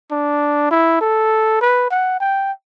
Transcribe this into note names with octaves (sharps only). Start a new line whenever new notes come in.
D4
E4
A4
B4
F#5
G5